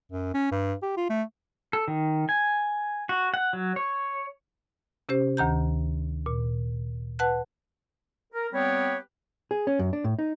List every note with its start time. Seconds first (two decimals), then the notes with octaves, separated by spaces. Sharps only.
0.12 F#2
0.34 C#4
0.51 G2
0.83 G4
0.97 F4
1.09 A3
1.73 A4
1.88 D#3
2.29 G#5
3.09 F#4
3.34 F#5
3.53 F#3
3.76 C#5
5.09 C3 C#4 G4 C5
5.37 D2 D#3 A#5 G6
6.26 A#2
7.19 B4 F#5 A5 F#6
8.33 A#4
8.52 G3 B3 C4 G4 B4 C#5
9.51 G#4
9.67 C#4
9.79 F#2
9.93 D4
10.04 A2
10.19 D#4